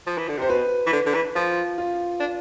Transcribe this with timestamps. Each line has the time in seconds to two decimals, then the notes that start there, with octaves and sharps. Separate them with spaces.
0.07 F3
0.18 E3
0.28 D3
0.39 C3 C5
0.49 B2 B4
0.87 E3
0.93 D3
1.06 D3
1.14 E3
1.35 F3 F4
1.78 F4
2.20 D4